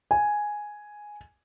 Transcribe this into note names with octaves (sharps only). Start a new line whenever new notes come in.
G#5